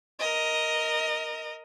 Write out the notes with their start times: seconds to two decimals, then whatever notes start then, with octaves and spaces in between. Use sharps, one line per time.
0.19 A#4 D#5